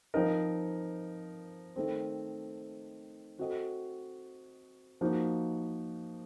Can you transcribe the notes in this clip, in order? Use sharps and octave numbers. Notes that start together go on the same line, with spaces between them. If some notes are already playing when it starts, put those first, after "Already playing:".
F3 C4 D#4 A#4 D#5
D#3 A3 C4
C4 F#4 A4 D#5
F3 A#3 D#4 F#4